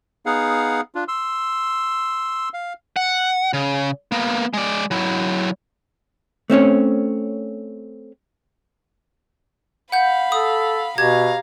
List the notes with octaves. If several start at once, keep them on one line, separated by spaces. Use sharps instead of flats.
B3 D#4 G#4 F5 F#5
D4 F4
C6 E6
F5
F#5
C#3
A#3 B3
G#3 D5
F#3 E4
A3 C4 C#4 C#5
F5 F#5 B5 G6
A4 D#6
B2 G4 F5 A#5 G#6